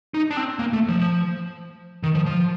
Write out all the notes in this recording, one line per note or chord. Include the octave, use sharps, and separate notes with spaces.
D#4
D4
C4
A#3
A3
F3
D#3
F3
F3